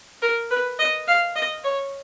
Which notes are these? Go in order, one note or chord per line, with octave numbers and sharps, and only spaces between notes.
A#4
B4
D#5
F5
D#5
C#5